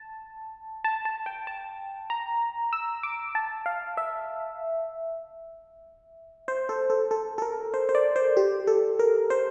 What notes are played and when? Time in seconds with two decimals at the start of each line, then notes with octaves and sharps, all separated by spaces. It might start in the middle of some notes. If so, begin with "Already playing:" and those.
Already playing: A5
0.84 A5
1.05 A5
1.26 G5
1.47 A5
2.10 A#5
2.73 E6
3.03 D6
3.35 A5
3.66 F5
3.97 E5
6.48 C5
6.69 A4
6.90 A4
7.11 A4
7.38 A4
7.42 A#4
7.74 C5
7.89 C5
7.95 D5
8.16 C5
8.37 G4
8.67 A4
8.99 A#4
9.30 C5